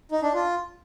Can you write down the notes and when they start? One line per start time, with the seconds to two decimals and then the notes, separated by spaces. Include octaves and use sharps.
0.12 D#4
0.23 D4
0.34 F4